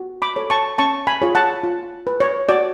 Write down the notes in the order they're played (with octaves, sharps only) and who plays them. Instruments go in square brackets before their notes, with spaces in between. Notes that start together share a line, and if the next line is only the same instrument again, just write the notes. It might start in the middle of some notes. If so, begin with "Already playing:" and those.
Already playing: [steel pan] F#4
B5 D6
A4 C#5
A5 C#6
C#4 A5 C#6
G#5 B5
F4 G#4 C#5
F#5 A5
F4
B4
C#5
F#4 D5